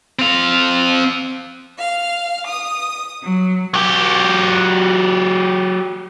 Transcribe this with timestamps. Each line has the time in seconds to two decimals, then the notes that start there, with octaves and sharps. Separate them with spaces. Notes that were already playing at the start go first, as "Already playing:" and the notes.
0.19 C4 F5
1.79 F5
2.47 D#6
3.22 F#3
3.74 F#3 G4